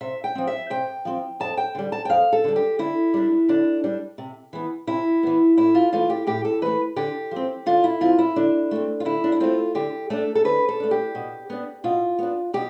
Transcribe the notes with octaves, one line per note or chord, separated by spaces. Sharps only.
C3 E5
G5
F3 C4
E5
C3 G5
F3 C4
F2 A5
G5
D3 G3
A5
G5
F2 F5
A4
D3 G3
G4
D3 E4
G3 D4
D3 D4
G3 D4
C3
E3 B3
C3 E4
E3 B3
A2 E4
F4
E3 A3 F4
G4
A2 G4
A4
E3 A3 B4
D3 G4
F3 C4
D3 F4
E4
F3 C4 F4
E4
D3 D4
A3 C4
F4
D3 E4
D4
E4
A3 C4 F4
D3 G4
A3 D4 A4
A4
D3 B4
A4
A3 D4
G4
B2
B3 D4
B2 F4
B3 D4
B2 G4